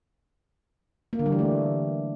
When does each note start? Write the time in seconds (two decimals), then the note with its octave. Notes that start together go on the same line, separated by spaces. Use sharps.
1.13 A#3
1.19 D3
1.26 G3
1.32 E3
1.39 A3